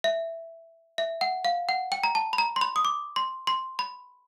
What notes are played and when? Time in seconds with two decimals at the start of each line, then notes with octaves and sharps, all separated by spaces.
0.04 E5
0.98 E5
1.21 F#5
1.45 F5
1.69 F#5
1.92 G5
2.04 A#5
2.15 A5
2.33 B5
2.38 A#5
2.56 C6
2.61 B5
2.76 D#6
2.85 D6
3.16 C6
3.47 C6
3.79 B5